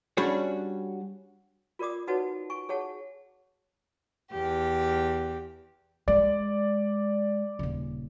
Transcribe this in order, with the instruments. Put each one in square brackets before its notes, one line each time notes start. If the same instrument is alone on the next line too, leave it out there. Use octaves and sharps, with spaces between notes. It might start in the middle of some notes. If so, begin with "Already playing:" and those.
[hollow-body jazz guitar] G3 C#4 D4 F#4 G#4 C#5
[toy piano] F4 A#4 D5 D6 D#6
D#4 F#4 B4 C#5 F#5 A5
G#5 C#6
G#4 C#5 F#5 A5
[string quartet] E2 G4
[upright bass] G#3 [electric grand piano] D5
[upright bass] D#1 C#3